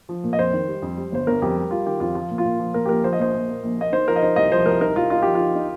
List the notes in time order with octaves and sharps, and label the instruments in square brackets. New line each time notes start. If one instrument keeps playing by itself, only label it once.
[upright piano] F3
A#2
[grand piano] D#5
[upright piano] F2 [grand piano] C5
[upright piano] D#3
G3
F2
G3
[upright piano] G1 [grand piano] C5
[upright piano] G1 [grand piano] A#4
[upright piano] F2 [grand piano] G4
[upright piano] G3
[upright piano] G3 [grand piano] F4
[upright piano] D#3 [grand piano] G4
[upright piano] F2 [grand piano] F4
[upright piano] F3 [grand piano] F4
[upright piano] A#2
[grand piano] F4
[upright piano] A#2
F3
[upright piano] A#2 [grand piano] A#4
[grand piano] G4
[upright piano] A#1 [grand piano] A#4
[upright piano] F3 [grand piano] C5
[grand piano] D#5
[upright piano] A#1 [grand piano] C5
[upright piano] A#2
A#3
A#1
[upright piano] A#3 [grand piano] D#5
[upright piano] D#4 [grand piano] C5
[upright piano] F3 [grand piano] A#4
[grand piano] D#5
[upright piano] D#4 [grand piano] C5
[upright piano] C2 [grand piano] D#5
[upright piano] F3 [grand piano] C5
[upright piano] C2 [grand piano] A#4
[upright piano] D#4 [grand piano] A#4
[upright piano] C2 [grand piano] F4
[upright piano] D#4 [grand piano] F4
[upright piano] F3 [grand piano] G4
[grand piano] F4
[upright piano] D#4
D#4